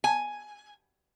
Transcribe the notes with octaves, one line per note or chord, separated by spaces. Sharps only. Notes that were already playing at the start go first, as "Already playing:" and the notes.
G#5